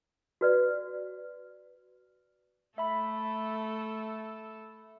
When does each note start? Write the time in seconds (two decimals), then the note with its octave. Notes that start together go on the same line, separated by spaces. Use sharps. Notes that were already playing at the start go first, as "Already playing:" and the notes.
0.41 F#4 B4 D5
2.78 A3 A4 E5 B5